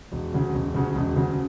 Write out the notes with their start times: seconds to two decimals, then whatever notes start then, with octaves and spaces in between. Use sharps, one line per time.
0.12 E1
0.33 D2 C#3 F#3
0.54 E1
0.74 D2 C#3 F#3
0.95 E1
1.16 D2 C#3 F#3